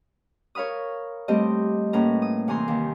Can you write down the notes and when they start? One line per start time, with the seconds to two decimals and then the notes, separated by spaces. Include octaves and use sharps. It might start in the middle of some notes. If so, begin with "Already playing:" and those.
0.55 A#4 C#5 F5 B5 D#6
1.28 G3 A3 C4 G4 C5 D#5
1.93 A2 A#3 C#4 B4 A#5
2.22 D#6
2.48 C3 E3 G#5 A#5 C6
2.68 D#2 D#3